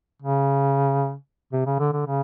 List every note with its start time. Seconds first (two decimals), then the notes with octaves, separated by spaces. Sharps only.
0.22 C#3
1.53 C3
1.66 C#3
1.79 D3
1.93 D3
2.06 C#3